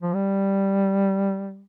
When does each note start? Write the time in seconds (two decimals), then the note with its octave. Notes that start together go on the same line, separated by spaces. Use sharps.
0.02 F3
0.14 G3